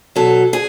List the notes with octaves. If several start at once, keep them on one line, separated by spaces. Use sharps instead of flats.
B2 F#3 A4
G#4